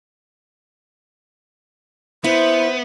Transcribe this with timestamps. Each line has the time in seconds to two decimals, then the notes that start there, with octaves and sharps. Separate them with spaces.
2.24 B3 E4 C5